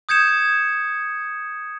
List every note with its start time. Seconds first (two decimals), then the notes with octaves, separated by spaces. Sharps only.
0.09 D#6 G6 G#6 C#7 E7